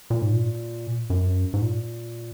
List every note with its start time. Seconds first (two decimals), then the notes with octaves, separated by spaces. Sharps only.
0.10 A#2
0.22 G#2
0.33 A#2
1.10 F#2
1.54 G#2
1.61 A#2